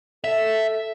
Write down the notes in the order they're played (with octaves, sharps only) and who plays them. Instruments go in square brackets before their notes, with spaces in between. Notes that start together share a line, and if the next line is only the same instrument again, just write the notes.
[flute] A4 [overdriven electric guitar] E5